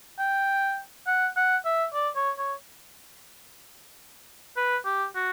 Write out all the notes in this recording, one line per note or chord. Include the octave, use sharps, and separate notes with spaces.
G5
F#5
F#5
E5
D5
C#5
C#5
B4
G4
F#4